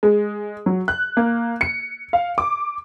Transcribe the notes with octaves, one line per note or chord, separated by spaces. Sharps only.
G#3
F#3
F#6
A#3
C#7
F5
D6